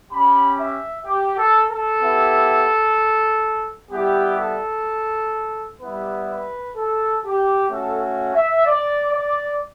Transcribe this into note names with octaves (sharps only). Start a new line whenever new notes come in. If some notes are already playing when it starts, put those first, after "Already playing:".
C#4 G4 B5
E5
G4
A4
A4
B3 E4 G4
G3 B3 E4 G4
A4
G3 B3 E4 G4 B4
B4
A4
G4
A3 C#4 F#4 A4
E5
D5
D5